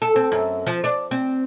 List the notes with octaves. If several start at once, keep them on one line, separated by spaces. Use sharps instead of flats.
A4
C4
F#2
F3
D4
C4